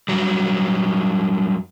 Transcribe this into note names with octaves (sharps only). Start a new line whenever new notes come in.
F#2 F#3 G3